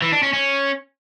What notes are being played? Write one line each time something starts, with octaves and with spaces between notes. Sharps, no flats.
E3
D4
C#4
C#4